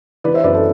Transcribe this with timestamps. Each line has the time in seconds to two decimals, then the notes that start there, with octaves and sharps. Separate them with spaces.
0.24 E3 B4 D5
0.34 C5 E5
0.44 F#2 B4 D5
0.54 A4 C5